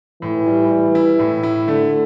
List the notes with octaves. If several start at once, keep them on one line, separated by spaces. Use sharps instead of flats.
A2 E3
G3
G3
E4
A2
E4
D3 A3